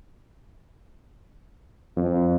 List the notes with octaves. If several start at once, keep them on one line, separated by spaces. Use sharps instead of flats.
F2